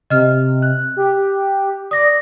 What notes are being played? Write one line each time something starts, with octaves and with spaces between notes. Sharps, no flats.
C3 D#5 F6
F#6
G4
D5 D#6 A#6